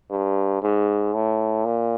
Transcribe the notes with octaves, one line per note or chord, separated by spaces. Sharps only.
G2
G#2
A2
A#2